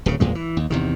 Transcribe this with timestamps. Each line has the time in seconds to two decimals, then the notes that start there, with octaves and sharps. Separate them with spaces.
0.06 D1 C#3
0.20 F#1 E2 A#2 G#3
0.35 E3
0.57 D#2
0.70 E2 C3 D#3